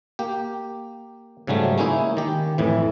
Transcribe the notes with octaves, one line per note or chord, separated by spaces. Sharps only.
A#3 G4
G#2 C#3 F#3 G3 A3
G#3 A#3 C#4 D#4 E4
D#3 G4
F2 A2 E3